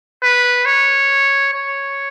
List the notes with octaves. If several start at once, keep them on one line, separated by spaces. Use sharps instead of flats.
B4
C#5
C#5